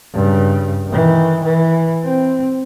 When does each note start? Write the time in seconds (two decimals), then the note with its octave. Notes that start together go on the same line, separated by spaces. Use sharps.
0.13 G2 C#3
0.88 D#3 E3
1.45 E3
2.05 C4